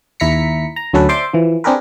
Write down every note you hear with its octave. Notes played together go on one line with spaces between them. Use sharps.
D#2 E4 A#5 B6 C#7
A#5
D2 F#3 C#4 A4 B4
C5 D5 E5 C6 D6
E3 F3
C4 D4 G4 G#4 A#4 B4